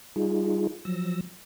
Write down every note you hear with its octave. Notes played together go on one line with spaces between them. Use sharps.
G3 D#4 F4 G#4
F3 F#3 E6 A#6